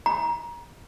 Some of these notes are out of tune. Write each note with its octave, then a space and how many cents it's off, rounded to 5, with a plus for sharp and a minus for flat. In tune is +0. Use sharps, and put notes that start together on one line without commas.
A#5 +25